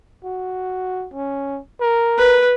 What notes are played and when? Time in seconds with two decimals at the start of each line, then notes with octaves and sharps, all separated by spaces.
0.24 F#4
1.14 C#4
1.81 A#4
2.18 B4